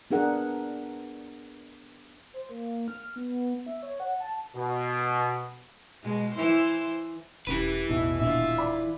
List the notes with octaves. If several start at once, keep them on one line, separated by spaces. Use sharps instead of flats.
B3 D4 G#4 A#4 F#5
C5
A#3
F6
B3
E5
C#5
F#5
A5
B2
B2 G#3
E3 E4 C5
E1 E3 C#4 G4 B4
A1 E2 B2 E5
D#1 A#2 D4 F4 E5
D5 B5 D6